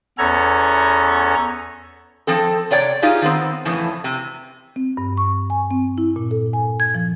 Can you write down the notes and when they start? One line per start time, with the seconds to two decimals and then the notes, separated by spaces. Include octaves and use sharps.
0.18 E2 B3 C#4 A4 A#5 G#6
2.27 F3 C4 A4
2.71 C3 C#5 D5 G5
3.02 D#4 F4 G4 G#4
3.22 D#3 B3 C4
3.65 F2 A2 C#3 E3
4.04 C3
4.76 C4
4.97 G2
5.17 C#6
5.50 G#5
5.71 C4
5.98 E4
6.16 A#2
6.31 A4
6.53 G#5
6.80 G#6
6.95 F3